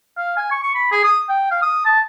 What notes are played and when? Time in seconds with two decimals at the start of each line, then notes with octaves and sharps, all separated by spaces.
0.17 F5
0.37 G#5
0.51 C#6
0.63 C#6
0.75 B5
0.92 G#4
1.04 D#6
1.29 G5
1.51 F5
1.62 D#6
1.85 A5